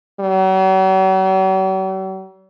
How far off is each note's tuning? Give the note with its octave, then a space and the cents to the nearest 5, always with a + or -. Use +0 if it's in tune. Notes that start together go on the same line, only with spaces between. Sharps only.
F#3 +45